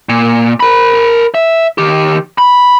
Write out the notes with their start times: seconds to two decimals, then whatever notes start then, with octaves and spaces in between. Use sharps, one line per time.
0.09 A#2
0.60 A#4 B5
1.35 E5
1.78 D#3 G4
2.38 B5